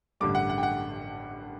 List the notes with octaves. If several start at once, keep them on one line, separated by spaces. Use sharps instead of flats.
A1 G2 D3 G3 D6
F#5
F#5
G5
F#5